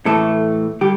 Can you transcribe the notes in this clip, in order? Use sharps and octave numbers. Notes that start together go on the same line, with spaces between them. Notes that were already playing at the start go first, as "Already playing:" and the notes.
A2 E3 A3 A4
D3 G3 G4